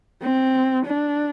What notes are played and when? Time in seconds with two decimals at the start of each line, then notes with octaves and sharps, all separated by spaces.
0.22 C4
0.85 D4